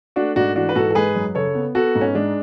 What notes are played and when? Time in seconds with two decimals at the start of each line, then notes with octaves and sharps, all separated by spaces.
0.16 A3 D4 F#4
0.36 G#2 D4 F#4
0.56 E3 D4 F#4
0.69 B4
0.75 G#2 F#4 A4
0.90 A4
0.95 G#3 G#4 B4
1.15 F#2
1.35 C#3 A4 C#5
1.55 B3
1.75 B3 F#4 A4
1.95 G#2
2.01 C#4
2.15 G#3 D4